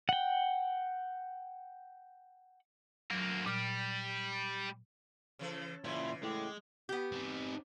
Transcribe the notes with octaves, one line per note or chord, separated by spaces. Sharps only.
F#5 G5
D2 F#3 A#3
A#2 G3 F6
C#3 E3 A4
A#2 C#3 E3 E4 D5 E5 C6
A2 G#3 F#5 G5 D6
B3 G4
C4 D#4